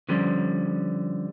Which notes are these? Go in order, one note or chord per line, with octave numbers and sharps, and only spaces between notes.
D3 F3 G3 C#4